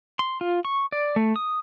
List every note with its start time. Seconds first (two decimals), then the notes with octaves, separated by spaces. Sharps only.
0.19 C6
0.41 F4
0.65 C#6
0.92 D5
1.16 A3
1.36 D#6